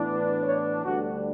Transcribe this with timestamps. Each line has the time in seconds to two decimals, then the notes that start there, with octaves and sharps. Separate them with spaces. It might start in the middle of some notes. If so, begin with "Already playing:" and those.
Already playing: A2 E3 B3 D4
0.43 C#5
0.84 D2 D3 G3 D4 F#4